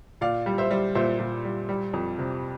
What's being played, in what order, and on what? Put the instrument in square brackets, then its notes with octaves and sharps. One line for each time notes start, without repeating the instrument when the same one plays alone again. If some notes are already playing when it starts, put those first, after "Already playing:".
[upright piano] A#2 D5 F5
G3
C5 E5
G3
A#2 C5 E5
A#2
G3
G3
F2
C3